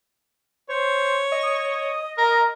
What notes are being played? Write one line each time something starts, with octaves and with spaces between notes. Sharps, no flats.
C5 C#5
D#5
D#6
A#4 A#5